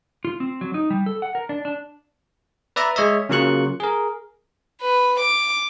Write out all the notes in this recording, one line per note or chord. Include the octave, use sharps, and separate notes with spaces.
F4
C4
F#3
D#4
G3
A4
F#5
A#4
D4
D4
B4 D5 E5 A#5
G#3 C#5 D#5 E5
C#3 F#3 A#3 F4 C#6 F#6
G#4 A#4
B4
D6